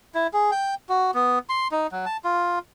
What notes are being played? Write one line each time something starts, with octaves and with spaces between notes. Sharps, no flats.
E4
G#4
G5
F#4
B3
C6
D#4
F#3
A5
F4